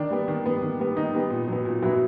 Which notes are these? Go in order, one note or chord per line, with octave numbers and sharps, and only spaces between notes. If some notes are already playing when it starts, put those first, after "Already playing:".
Already playing: D#3 D4
G3 B3
D#3
G3 B3
D#3
G3 B3
D#3 D#4
G3 B3
A#2
F#3 B3
A#2
F#3 B3 E4 F#4